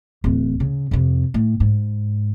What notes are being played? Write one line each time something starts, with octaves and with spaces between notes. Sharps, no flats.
D1 E3
C#3
F2 C3
A2
G#2